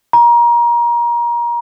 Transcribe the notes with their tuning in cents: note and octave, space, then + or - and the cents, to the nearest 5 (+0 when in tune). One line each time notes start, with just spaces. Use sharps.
A#5 +25